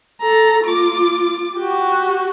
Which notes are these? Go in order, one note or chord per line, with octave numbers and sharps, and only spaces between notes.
A4 A#5
F4 D6
F#4 G4